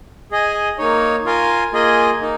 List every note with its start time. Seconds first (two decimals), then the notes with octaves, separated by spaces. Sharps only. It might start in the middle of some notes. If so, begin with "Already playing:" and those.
0.31 G#4 D#5 G#5
0.78 A#3 D#4 C#5
1.25 F4 A#4 F5 G#5
1.73 A#3 F4 G#4 D#5 G#5
2.20 A#3 D#4